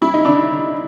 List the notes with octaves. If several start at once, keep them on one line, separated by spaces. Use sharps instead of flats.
G3 E4
D#4
D3 D4 E4
D3